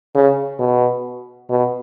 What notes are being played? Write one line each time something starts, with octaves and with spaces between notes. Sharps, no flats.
C#3
B2
B2